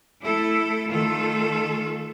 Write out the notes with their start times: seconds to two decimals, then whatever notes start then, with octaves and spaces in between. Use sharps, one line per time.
0.25 A3 E4 A4
0.91 D#3 A3 F4 A4